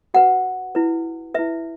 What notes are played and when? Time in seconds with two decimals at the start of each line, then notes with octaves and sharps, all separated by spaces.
0.14 F#4 B4 F#5
0.75 E4 B4
1.34 E4 B4 E5